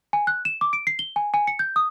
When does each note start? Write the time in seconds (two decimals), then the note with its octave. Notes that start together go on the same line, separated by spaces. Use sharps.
0.13 G#5
0.27 F#6
0.45 E7
0.61 D6
0.73 D7
0.87 C7
0.99 G7
1.16 G#5
1.34 G#5
1.47 C#7
1.59 G6
1.76 D#6